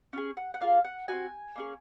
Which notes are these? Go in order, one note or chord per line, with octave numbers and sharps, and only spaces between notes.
C#4 F4 G#4
F#5
F#5
A#3 F4 G#4 F5
F#5
C4 D#4 F#4 G#5
A#3 C#4 G#4